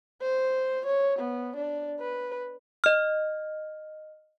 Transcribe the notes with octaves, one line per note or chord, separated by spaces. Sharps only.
C5
C#5
B3
D4
B4
D#5 F6